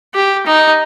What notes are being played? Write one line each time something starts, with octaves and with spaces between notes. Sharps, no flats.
G4
D#4